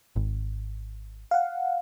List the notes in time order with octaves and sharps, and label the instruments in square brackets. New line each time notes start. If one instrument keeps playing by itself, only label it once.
[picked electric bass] G#1
[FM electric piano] F5 F#5